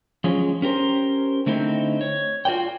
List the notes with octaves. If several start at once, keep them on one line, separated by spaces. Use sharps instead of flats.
F3 F#3 G#3 C#4
C#4 G4 A#4 C5
D3 A3 C4 D#4 E4
C#5
F4 F#4 C5 D5 G5